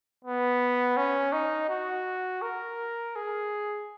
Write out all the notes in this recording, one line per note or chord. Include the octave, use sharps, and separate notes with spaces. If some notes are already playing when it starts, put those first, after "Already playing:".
B3
C#4
D#4
F#4
A#4
G#4